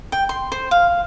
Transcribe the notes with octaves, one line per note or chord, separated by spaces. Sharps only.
G5
C6
C5
F5